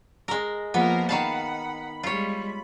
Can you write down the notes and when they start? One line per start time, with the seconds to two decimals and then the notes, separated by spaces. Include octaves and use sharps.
0.28 G#3 A#4
0.74 F3 A#3 B3 A#4
1.09 D#3 F5 F#5 A5 B5
2.03 G3 G#3 F4 C#5